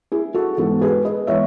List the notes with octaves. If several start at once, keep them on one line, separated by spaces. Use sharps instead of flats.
E4 G#4
F#4 A4
G#2 E3 G#3 B3 F#4 A4
G#4 B4
B4 D#5
E3 G#3 B3 C#5 E5